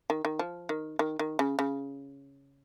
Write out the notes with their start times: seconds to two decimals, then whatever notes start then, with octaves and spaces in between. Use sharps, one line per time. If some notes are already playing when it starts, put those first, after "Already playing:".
0.10 D#3
0.25 D#3
0.39 F3
0.69 D#3
0.99 D#3
1.19 D#3
1.39 C#3
1.59 C#3